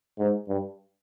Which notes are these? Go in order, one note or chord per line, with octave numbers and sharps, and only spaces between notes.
G#2
G2